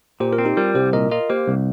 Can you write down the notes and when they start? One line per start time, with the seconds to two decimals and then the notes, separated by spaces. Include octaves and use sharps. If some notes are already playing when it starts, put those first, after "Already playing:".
0.20 A#2 G4 C5
0.33 F4 A#4
0.38 C4
0.45 D#4 G4
0.57 G3 F4 A#4
0.75 C2 G4 C5
0.93 A#2 A#4 D#5
1.11 F4 A#4 D#5
1.29 A#3 G4 C5
1.48 C2